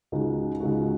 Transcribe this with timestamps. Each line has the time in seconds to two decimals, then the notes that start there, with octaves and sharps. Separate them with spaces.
0.12 C#2 C#3 G#3 D#4 F#4
0.60 C#2 C#3 G#3 D#4 F#4